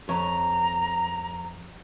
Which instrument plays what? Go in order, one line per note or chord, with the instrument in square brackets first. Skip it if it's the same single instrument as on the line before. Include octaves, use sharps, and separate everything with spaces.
[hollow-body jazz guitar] F2 C#5 [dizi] A#5